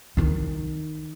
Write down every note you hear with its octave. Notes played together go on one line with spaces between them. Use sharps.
D#3 D#4